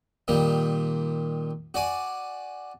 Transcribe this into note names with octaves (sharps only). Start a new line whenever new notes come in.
A#2 D#3 G3
F#4 D5 G#5